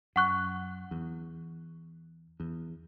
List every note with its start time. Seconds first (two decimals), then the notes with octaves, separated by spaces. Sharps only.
0.16 F#2 F#5 C#6 F#6
0.91 E2
2.40 E2